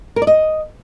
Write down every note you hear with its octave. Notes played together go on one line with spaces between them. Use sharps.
A#4
D5
D#5